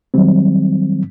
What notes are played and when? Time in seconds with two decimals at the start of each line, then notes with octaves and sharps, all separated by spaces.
0.14 D#3 F#3 G3 C4